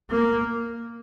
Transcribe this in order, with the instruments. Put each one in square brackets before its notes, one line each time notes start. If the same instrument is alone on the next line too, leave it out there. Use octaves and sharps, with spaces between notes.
[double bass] A#3